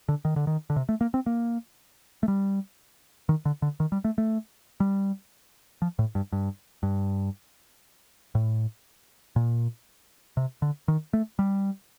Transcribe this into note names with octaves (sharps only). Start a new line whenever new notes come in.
D3
D#3
D3
D#3
D3
C3
A3
A#3
C4
A#3
A3
G3
D#3
D3
D3
D#3
G3
A3
A3
G3
F3
A2
G2
G2
G2
A2
A#2
C3
D3
D#3
A3
G3